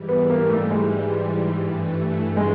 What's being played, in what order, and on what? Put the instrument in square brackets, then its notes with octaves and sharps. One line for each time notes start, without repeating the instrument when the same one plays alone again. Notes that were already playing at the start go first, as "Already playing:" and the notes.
Already playing: [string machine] G#2 E3 G3
[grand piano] B3
A#3
A3
G#3
[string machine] G2 E3 A3
[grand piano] G#3